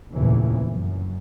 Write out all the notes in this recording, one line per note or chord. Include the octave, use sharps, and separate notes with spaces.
F1 D#2 A#2 C#3 E3
F#2